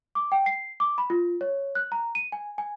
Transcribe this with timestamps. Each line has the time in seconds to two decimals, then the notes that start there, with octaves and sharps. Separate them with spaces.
0.15 D6
0.32 G5
0.46 C7
0.80 D6
0.98 B5
1.10 F4
1.41 C#5
1.75 F#6
1.92 A#5
2.15 D#7
2.32 G#5
2.58 G#5